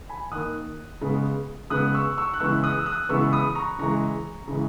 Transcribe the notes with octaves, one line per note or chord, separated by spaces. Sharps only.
G#5 B5
D#3 A#3 D#6 F#6
C#3 G#3 B3
C#3 G#3 B3 D#6 F#6
C#6 E6
C#6 E6
F#6
C#3 E3 G#3 B3 C#6 E6
D#6 F#6
E6
D#6 F#6
C#3 E3 G#3 B3 C#6 E6
B5 D#6
A#5 C#6
C#3 E3 G#3 A#5 C#6
C#3 E3 G#3